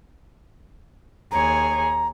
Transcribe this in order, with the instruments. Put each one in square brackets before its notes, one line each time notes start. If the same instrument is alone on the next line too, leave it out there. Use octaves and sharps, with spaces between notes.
[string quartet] D#2 G#4 C#5 [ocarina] A#5